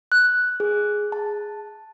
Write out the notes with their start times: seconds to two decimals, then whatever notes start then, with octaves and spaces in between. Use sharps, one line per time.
0.12 F#6
0.60 G#4
1.12 A5